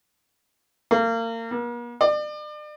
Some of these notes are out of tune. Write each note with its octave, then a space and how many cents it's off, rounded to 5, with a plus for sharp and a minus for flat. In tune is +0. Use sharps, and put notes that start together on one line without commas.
A#3 -30
A#3 +45
D5 +40